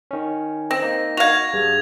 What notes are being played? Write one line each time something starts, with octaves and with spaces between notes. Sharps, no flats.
D#3 C#4
C4 A#6
A#3 D#4
F#4 F5 G#6 A#6 F7
G2 G#4